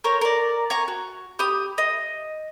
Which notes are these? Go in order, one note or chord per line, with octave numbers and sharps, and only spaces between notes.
A#4 C5 C#5
A#4 D5
G#5 A#5 C#6
F#4
G4 B5 D#6
D#5